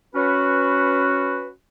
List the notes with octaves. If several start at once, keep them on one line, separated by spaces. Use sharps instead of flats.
C#4 F#4 B4